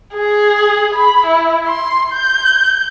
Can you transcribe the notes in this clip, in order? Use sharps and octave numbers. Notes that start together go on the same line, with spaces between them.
G#4
B5
E4
C6
G6